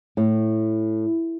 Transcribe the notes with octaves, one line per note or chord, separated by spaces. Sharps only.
A2